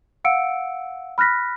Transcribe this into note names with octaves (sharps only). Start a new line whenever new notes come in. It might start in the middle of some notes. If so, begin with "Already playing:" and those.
F5 F#5 E6 C#7 D7
B5 F6 F#6 A#6 B6